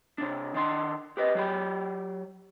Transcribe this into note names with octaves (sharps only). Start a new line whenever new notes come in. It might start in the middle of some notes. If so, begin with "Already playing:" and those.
C3 D4
D#3 D4 C6
G4 B4 D#5
F#3 G4 B5